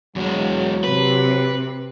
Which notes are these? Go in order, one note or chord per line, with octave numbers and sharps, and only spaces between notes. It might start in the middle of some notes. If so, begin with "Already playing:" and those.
E2 F#3 G#3
C3 B4